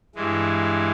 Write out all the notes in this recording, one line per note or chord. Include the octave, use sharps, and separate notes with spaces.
G2 E3 G#3